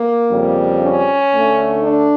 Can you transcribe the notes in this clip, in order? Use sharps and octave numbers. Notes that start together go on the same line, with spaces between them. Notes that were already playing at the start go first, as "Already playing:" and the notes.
Already playing: A#3
F2 C#3 G3
C#4
D2 D3 A3
D4